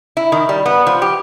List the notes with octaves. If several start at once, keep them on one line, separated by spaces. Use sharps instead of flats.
E4
D#3
G3
B3
F3
G4